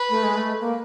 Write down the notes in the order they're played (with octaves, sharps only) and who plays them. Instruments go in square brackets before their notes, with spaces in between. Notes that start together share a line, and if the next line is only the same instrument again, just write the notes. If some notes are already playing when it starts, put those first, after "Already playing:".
Already playing: [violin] B4
[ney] A3
G#3
A3
A#3